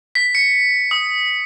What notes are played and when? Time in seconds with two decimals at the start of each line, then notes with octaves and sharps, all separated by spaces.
0.15 B6
0.35 C#7
0.91 D#6